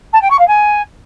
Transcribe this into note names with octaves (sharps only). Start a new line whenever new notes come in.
A5
G5
C#6
F5
G#5